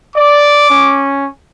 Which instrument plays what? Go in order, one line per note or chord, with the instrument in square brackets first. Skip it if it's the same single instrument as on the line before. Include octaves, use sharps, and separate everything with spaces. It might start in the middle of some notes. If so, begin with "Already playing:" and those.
[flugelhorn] D5 [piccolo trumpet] D6
[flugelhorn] C#4